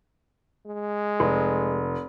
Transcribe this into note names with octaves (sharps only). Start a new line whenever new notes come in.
G#3
F1